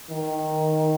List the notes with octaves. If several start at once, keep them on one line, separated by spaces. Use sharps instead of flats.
D#3